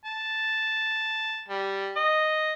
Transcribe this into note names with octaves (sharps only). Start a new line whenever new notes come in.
A5
G3
D#5